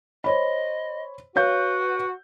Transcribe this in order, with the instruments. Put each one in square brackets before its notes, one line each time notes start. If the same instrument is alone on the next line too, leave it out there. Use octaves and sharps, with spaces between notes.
[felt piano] C5 C#5 B5 [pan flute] D#5
[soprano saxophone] F#4 [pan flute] B4 [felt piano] C#5 F5 G6